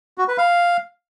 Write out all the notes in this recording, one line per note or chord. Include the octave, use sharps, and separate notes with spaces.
F#4
B4
F5